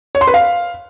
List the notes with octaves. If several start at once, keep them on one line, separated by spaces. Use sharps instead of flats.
C#5
C6
B4
F5